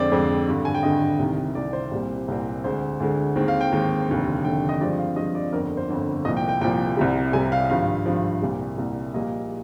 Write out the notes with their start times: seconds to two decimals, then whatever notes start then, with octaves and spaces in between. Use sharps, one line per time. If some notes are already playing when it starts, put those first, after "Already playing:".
Already playing: F2 D3 G#3 C4 D5
0.11 F2 D3 G#3 C4
0.47 G#1 G2 D3
0.65 G#5
0.74 G5
0.83 G#1 G2 D3 D#5
1.19 C2 C3 D#3
1.55 C2 C3 D#3 D5
1.73 C5
1.91 C2 A#2 G3 C4
2.28 C2 A#2 G3 C4
2.64 D2 D3 G#3 C5
3.00 D2 D3 G#3
3.36 D#2 D#3 G#3 C4
3.48 F5
3.61 G5
3.72 D#2 D#3 G#3 C4
4.08 F1 D#2 D3
4.44 F1 D#2 D3 G5
4.69 D#5
4.81 G2 F3 G#3 C4 D5
4.99 F5
5.16 G2 F3 G#3 C4 D#5
5.35 D5
5.52 G1 F2 D3 A#4
5.77 C5
5.89 G1 F2 D3
6.25 C2 A#2 F3 D#5
6.37 G5
6.49 G5
6.61 C2 A#2 F3 G5
6.97 C2 C3 G3
7.33 C2 C3 G3 G#5
7.52 F5
7.70 G#1 G2 F3 F5
8.06 G#1 G2 F3
8.42 C2 A#2 G3
8.78 C2 A#2 G3
9.14 A#1 A#2 G3 A#3 D#5